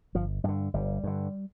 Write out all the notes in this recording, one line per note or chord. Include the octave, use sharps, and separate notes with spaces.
G1 F3
G2 D3 G3
G1 G3
G2 D3